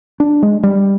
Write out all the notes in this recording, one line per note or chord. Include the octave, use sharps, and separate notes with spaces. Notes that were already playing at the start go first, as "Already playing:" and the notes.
D4
G#3
G3